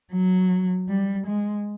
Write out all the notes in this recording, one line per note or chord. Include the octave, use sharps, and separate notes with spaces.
F#3
G3
G#3